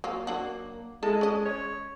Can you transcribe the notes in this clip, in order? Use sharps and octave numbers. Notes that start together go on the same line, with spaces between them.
F#3 A#3 F4
F#3 A#3 D4 F#4
G#3 E4 A4 A5
C#4 D#5
C#5